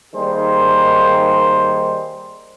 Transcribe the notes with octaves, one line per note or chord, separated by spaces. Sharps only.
D#3 G3 A#3 D#4 G#4 C5